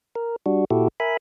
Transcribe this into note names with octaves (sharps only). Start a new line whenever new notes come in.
A#4
G3 D4 F#4
A#2 E4 F#4 G4 A4
A#4 E5 G#5 B5